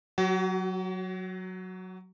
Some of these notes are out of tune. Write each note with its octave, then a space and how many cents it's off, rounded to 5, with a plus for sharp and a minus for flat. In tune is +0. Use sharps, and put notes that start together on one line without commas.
F#3 +0 F#4 +40